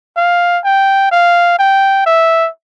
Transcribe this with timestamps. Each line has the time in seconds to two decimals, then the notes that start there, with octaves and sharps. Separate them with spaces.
0.16 F5
0.64 G5
1.11 F5
1.59 G5
2.06 E5